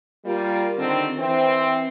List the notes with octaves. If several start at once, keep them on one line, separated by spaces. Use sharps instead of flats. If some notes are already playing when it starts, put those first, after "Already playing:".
G3 A#3 F4
D3 D#3 C4
E3 C4